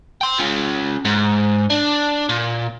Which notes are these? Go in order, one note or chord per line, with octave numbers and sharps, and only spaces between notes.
G5 C6
C#4 F4
G#2
D4
A#2